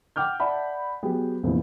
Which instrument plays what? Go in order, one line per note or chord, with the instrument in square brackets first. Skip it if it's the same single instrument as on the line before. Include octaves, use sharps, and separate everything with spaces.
[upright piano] F#5 G5 D6 F6 G6
D5 E5 F#5 A5 B5
F#3 B3 G4 G#4
F1 A#1 F2 B2 E3